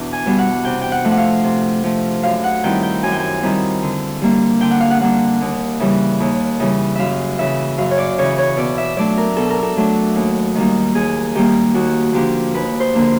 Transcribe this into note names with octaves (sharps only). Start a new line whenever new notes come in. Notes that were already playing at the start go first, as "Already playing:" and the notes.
Already playing: E2 B2 D4
G#5
B2 G3 B3 D4
F#5
C3 G5
G5
F#5
F3 A3
F#5
F5
C3
F3 A3
F#2 F5
F#5
D#3 G3 C4 E4 G5
G5
F#2 G#5
G5
G#5
D#3 G3 C4 E4
D3
G3 A#3 D4
D3 G5
F#5
F5
F#5
G3 A#3 D4 F#5
D#2
C#3 E3 G3
D#2
C#3 E3 G3
F#2 E5 F5
C#3 E3 E5
F#2 F5
C#5
D5
C#3 E3 C#5
C#5
B2 D5
E5
F#3 A3 D4 D5
A#4
B2 A4
A#4
A4
F#3 A3 D4
D#2
D#3 G3 A#3
D#2 G#4
D#3 G3 A#3 G4
D#2 F#4
D3 F3 A#3 D4 G4
D#2 B4
C5
D3 F3 A#3 D4